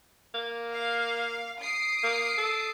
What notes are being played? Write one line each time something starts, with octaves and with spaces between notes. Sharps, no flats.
A#3
F5
D#6 C7 D7
A#3
A4